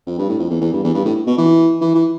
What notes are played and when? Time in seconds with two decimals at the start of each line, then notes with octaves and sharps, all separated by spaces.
0.07 F2
0.18 G2
0.29 A2
0.39 F2
0.50 E2
0.61 E2
0.73 G2
0.84 E2
0.94 G2
1.05 A2
1.27 B2
1.38 E3
1.81 E3
1.95 E3